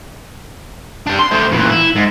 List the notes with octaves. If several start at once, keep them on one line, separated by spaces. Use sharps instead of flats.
G3 D4
C6
A3 C5
A#2 E3
E4
G#2